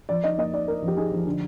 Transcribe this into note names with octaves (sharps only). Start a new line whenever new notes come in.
F3 D5
D#4 D#5
A#3 D#5
D#4 D5
D#4 A#4
F3
G4
D#4 G#4
F3
D3